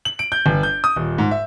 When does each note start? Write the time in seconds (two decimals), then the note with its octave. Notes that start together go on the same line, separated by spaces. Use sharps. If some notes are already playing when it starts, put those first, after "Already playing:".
0.05 F#7
0.19 D7
0.32 G6
0.46 G1
0.63 G6
0.84 D#6
0.96 D#1
1.18 G#2
1.31 E5